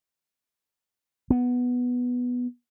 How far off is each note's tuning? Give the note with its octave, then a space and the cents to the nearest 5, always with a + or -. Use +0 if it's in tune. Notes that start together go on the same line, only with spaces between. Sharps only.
B3 +0